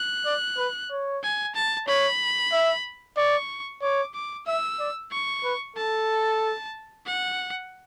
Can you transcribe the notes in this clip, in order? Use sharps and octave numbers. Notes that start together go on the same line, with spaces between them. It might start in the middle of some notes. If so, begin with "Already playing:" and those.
Already playing: F#6
D5
B4
C#5
G#5
A5
C#5 B5
E5
D5 C#6
C#5 D6
D6
E5 E6
D5
C#6
B4
A4 A5
F#5